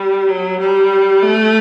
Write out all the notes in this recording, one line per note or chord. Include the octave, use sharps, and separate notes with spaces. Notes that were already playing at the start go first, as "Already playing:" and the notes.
Already playing: G3
F#3
G3
A3